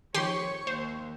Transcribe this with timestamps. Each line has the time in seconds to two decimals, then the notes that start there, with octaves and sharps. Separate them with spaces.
0.14 D#3 F3 G4 C#5 G5 C6 C#6
0.67 D#2 C5